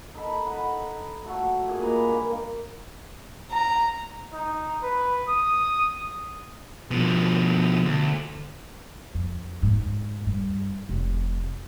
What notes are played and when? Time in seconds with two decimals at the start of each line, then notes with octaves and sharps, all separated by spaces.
0.15 D#4 A4 A5 B5
0.46 D#5 F#5 B5
1.24 F#3 A3 F#4
1.67 A#2 G#4 D5
1.82 G#3 B4 A#5 D6
2.07 G2 A#3
3.51 A#5
4.33 D#4
4.83 B4
5.28 D#6
6.91 B2 F3
7.85 D2
9.14 F2
9.63 G#2
10.26 G2
10.89 F1